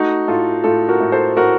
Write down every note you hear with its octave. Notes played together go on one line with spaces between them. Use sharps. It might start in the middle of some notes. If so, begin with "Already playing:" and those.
Already playing: A3 D#4 F#4
A2 F4 A4
A2 F4 A4
F#4 A#4
A2
A4 C5
A2 F#4 A#4